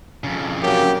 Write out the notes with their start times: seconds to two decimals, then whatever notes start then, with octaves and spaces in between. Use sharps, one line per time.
0.24 F2 C#3
0.62 F#3 A#3 G4